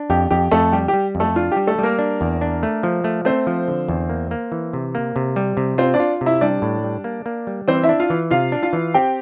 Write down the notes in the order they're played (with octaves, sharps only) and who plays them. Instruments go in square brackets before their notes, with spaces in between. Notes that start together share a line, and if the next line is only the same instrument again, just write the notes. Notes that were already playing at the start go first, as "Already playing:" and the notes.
Already playing: [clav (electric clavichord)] D4
[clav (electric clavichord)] F2 [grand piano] G4
[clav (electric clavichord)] F2 [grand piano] G4
[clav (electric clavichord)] F2 [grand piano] A3 A4
[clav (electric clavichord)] G3 [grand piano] G4
[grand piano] G4
[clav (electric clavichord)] G3
F2
[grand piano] A3 A4
[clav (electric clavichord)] D4 [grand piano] F4
[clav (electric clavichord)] G3 [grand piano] G4
[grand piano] A3 A4
[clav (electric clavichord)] G3 [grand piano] A#3 A#4
[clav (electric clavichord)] D4
E2
D4
A3
F3
A3
[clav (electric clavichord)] A3 [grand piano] C4 C5
[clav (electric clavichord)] F3
D3
E2
A#3
A#3
E3
C3
A#3
C3
G3
C3
[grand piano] C4 C5 [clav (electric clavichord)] F4
[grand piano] D4 D5
[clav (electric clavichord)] F4
C3
[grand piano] E4 E5
[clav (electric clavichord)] G3 [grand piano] D4 D5
[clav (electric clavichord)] A2
G3
A#3
A#3
G3
[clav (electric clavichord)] E3 [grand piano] C4 C5
[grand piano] E4 E5
[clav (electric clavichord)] D4
[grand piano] F4 F5
[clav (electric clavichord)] E3
[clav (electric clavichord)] C3 [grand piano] F4 F5
[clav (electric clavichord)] D4
[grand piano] F4 F5
[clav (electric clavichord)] E3
[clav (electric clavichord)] C4 [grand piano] G4 G5